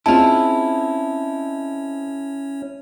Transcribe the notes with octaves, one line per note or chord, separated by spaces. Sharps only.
C4 C#4 E4 F4 G#4 C#5 D#5 A5